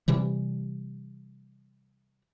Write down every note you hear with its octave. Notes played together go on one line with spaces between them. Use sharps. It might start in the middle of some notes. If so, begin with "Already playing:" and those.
C3 E3 G3